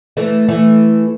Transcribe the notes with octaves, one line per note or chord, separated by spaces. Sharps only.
E3 A3
E3 A3